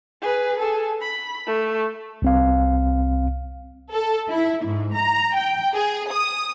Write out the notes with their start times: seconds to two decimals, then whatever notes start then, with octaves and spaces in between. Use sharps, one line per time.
0.22 G#4 B4
0.59 G#4 A4
1.02 B5
1.47 A3
2.22 C2 C4 F5
3.93 A4
4.30 E4
4.65 G#2
4.95 A#5
5.35 G5
5.75 G#4
6.11 D#6